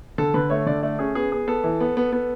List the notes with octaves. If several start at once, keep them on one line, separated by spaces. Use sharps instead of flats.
D3 A4
D3 B4
A3 C#5
D3 D5
A3 D5
C#4 G#4
B3 G#4
B3 G#4
B3 A4
E3
B3
B3
B3